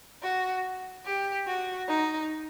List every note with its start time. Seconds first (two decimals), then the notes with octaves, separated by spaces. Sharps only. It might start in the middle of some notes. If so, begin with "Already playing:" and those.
0.22 F#4
1.04 G4
1.46 F#4
1.87 D#4